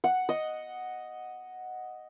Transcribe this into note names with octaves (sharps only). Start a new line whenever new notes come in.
F#5
D#5